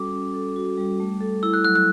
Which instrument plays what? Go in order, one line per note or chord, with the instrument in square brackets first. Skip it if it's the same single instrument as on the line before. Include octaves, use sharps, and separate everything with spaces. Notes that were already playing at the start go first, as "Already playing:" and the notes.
Already playing: [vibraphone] G3 C#4 F#4 A4 [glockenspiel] D6
[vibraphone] C#4
A4
F#4
G3
A3
A4
[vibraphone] E4 [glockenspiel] E6
[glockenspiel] F#6
[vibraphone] F#3 [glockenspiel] F#6
[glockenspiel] F#6